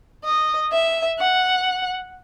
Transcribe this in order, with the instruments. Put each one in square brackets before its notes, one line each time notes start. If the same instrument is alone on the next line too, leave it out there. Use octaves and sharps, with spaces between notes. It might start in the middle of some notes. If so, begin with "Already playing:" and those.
[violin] D#5
E5
F#5